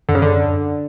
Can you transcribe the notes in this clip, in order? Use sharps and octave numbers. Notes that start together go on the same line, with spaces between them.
F#2 D3
C#3
D3